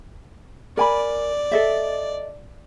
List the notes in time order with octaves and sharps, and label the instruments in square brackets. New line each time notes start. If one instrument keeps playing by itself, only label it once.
[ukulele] A#4 G#5 B5 [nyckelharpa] D5
[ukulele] A4 D#5 E5